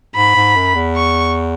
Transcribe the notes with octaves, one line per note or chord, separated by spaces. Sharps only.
G#2 B5
G#2
F#2
E2
C#6